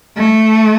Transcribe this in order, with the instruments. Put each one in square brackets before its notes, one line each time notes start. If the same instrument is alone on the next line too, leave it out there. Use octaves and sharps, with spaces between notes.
[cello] A3